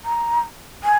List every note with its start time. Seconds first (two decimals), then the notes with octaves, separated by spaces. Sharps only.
0.05 A#5
0.83 G#5